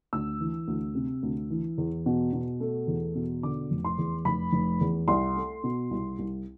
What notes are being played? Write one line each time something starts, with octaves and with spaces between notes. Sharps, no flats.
D2 E6
E3
D2
C3
D2
E3
E2
B2
B2
A3
E2
B2
D3 D6
F1
C6
E2
F1 B5
F1
E2
C2 C6
A3
B2
C2
C2